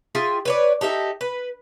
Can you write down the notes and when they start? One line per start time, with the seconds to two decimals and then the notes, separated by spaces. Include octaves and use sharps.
0.15 F4 G#4 E5 G5
0.45 B4 C#5 D5
0.81 D#4 G4 A4 E5
1.21 B4